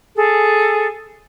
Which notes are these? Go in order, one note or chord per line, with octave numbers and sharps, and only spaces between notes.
G#4 A4